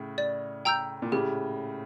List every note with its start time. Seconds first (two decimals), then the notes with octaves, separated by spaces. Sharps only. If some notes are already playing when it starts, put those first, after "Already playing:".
Already playing: A2 C#3
0.18 D5
0.65 G5 A#5 E6 G6
1.02 A#2
1.12 A2 C#3 G4